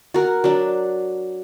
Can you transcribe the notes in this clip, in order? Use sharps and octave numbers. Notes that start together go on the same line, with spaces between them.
F#4 A#4
F#3 D4